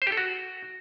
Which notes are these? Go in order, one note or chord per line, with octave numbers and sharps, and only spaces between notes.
C5
G4
A4
F#4